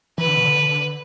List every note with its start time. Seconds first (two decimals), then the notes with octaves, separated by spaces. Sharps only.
0.18 E3 B4
0.28 D3
0.37 B2
0.45 D3